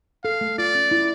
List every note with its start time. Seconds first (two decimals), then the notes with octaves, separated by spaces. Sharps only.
0.24 A4 F5
0.41 A3
0.58 F4 D5
0.75 C#4
0.91 E4